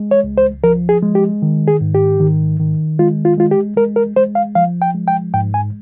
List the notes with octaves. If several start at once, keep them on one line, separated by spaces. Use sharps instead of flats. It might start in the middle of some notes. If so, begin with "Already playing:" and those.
Already playing: G#3
C#5
C#2
C5
F3 A#4
G#4
G#3
G4
D#3
G#4
G#2
G4
D#3
D#3
G#3 F4
F4
G#3 F4
G4
G#3 A#4
A#4
G#3 C5
F5
F3 F5
G5
G#3
G5
G#2 G5
G#5